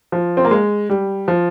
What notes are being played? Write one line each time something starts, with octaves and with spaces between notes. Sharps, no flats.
F3
C4
A#3
G#3
G3
F3